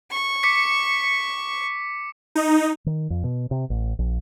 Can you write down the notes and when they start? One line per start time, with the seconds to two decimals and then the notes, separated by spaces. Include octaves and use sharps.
0.11 C#6
0.43 D6 B6 C#7
2.35 D#4
2.86 D#3
3.10 F2
3.24 B2
3.51 C3
3.70 A1
3.99 A#1